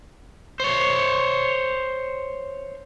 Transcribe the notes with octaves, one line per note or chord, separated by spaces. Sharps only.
C5 C#5